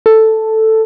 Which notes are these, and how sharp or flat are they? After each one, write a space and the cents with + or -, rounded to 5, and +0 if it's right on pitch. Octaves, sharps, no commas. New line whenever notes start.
A4 +5